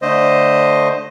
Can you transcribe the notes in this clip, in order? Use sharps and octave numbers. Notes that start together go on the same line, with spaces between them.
D3 A3 C5 D#5